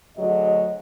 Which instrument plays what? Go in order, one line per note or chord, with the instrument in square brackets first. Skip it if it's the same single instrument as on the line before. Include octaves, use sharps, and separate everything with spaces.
[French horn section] D2 F#3 G#4 D#5